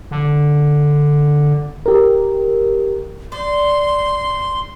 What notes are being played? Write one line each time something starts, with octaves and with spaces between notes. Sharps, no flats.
D3
G4 A#4
D5 C6